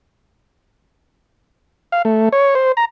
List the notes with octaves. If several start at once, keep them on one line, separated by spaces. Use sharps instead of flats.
F5
A3
C#5
C5
A#5